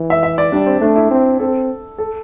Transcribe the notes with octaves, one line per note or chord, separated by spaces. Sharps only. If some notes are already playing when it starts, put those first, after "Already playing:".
Already playing: E3
E5
E5
D5
G3 D4
C4
A3 D4
E4
C4
C4 A4
A4